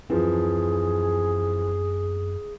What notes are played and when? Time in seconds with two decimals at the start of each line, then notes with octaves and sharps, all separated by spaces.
0.10 F#2 E3 F3 C4 G#4